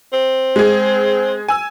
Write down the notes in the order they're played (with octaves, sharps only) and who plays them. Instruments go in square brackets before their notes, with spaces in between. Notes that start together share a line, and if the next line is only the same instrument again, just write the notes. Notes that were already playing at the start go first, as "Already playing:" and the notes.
[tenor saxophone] C4
[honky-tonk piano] G#3 G#4
G#5 E6